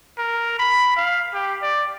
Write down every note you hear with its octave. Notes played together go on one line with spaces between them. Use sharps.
A#4
B5
F5
G4
D5